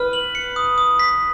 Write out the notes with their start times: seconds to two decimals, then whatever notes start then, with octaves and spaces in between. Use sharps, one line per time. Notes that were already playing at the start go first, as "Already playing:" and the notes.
Already playing: B4 F6
0.13 F#7
0.35 C#7
0.56 D#6
0.78 D#6
0.99 B6